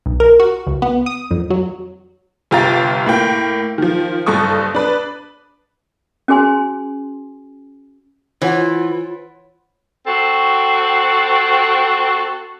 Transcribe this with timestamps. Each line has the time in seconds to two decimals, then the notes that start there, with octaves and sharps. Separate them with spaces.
0.06 B1
0.20 A#4
0.40 F#4
0.67 C#2
0.82 B3
1.06 D#6
1.31 F2
1.50 F#3
2.51 G1 C3 F4 G5 A#5 A6
3.06 A2 A#3 G5
3.78 D#3 F3
4.26 F#1 G2 A4 C#6 D#6
4.75 D4 B4
6.28 C#4 F#4 G#4 G#5 C6
8.42 E3 F4 C5 C#5 F#5
10.07 C4 F#4 A4